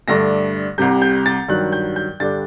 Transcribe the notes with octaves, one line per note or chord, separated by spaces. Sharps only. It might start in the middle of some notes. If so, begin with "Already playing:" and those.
G2 D3 A3 D4 A#6
C2 C3 G3 G6
G6
A6
G2 D#3 F#3 F#6
G6
G6
G2 D3 G3 D4 A6